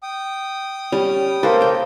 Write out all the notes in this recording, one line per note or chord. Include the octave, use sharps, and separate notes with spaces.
G5 D#6
G3 C#4
A#3 A4 B4 C5
C#3 G5